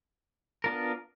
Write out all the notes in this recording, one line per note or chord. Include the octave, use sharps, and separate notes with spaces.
B3 D4 F4 A#4